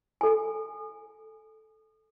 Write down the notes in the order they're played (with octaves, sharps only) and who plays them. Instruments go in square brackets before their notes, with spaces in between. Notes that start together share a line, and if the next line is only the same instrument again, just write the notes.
[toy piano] A4 G#5